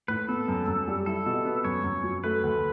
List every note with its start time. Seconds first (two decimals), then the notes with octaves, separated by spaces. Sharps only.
0.08 A2 B4
0.28 B3 A4
0.48 F#2
0.68 F#2
0.88 G3
1.06 E4 A4
1.26 B2
1.45 B3
1.65 F#2 C#5
1.84 F#2
2.04 F#3
2.24 A3 B4
2.44 D2